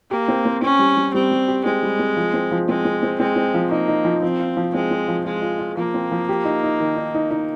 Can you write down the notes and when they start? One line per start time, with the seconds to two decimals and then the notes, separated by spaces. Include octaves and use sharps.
0.10 A#3 G4
0.28 C4
0.45 C4
0.62 C4 C#4
0.79 G3
0.97 G3
1.14 G3 C4
1.31 G3
1.48 G4
1.65 G#3 C4
1.83 G3
1.99 C4
2.17 F3
2.34 C4
2.51 F3
2.68 G#3 C4
2.85 C4
3.03 C4
3.20 G#3 C4
3.36 C4
3.54 F3
3.71 A#3 D#4
3.88 D#4
4.05 F3
4.22 F3 C4
4.40 F4
4.57 F3
4.74 G#3 C4
4.91 C4
5.08 F3
5.25 G#3 F4
5.42 F4
5.59 F4
5.77 F3 A#3
5.94 C4
6.12 F3
6.29 G4
6.45 D#4
6.63 D#4
6.80 D#3
6.97 D#4
7.15 D#4
7.31 D#4